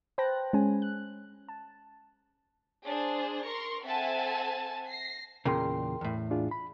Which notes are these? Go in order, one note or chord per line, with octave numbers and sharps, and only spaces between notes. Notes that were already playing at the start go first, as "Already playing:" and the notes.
B4 C5 G5 A5 F#6 A#6
G#3 C#4 G#5
F#6
A5
D4 G#4 C5
A#4 C6 C#6
C4 A4 E5 F#5 G#5 A5
A#6 C7
E2 A#2 C#3 A#4 G5 C6
E2 A2
D4 F4 G#4
B5